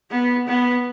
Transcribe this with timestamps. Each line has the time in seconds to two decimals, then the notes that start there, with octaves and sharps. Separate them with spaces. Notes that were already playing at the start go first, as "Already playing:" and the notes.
0.11 B3
0.47 B3